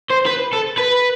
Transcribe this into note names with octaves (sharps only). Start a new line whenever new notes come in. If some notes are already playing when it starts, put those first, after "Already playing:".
C5
B4
A4
B4